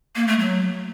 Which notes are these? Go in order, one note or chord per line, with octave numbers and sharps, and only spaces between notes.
A#3
A3
F#3